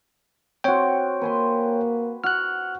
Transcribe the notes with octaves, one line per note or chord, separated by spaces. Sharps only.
C4 F#4 C#5 G5
A#3 B4 G#5 C6
F#4 F6 F#6